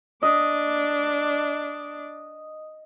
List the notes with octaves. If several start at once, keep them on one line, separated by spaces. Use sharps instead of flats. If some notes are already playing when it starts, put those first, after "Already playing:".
D4 D#5 D6